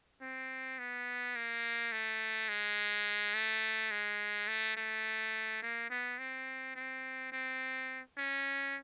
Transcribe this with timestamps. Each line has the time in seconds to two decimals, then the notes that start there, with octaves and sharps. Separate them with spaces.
0.21 C4
0.79 B3
1.36 A#3
1.92 A3
2.49 G#3
3.34 A3
3.91 G#3
4.48 A3
4.77 A3
5.62 A#3
5.90 B3
6.19 C4
6.75 C4
7.32 C4
8.18 C#4